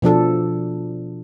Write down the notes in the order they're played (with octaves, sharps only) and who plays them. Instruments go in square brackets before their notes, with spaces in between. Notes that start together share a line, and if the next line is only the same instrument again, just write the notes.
[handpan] B2 F3 D4 A4